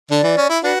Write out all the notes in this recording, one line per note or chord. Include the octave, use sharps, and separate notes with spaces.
D3 D5
E3
C#4
E4
D4 F#4 B4